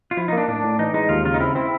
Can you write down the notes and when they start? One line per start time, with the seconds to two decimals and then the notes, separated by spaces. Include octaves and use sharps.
0.11 F4
0.17 F3 E4
0.28 D#4
0.32 A#3 D4
0.48 A2 D4
0.63 A2
0.79 E3 D#4
0.94 G#3 D#4
1.09 D#2 F4
1.25 C#3 F4
1.34 D#4
1.40 C4 E4
1.55 C4 E4